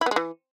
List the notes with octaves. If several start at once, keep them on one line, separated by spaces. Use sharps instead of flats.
E4
B3
G#3
E3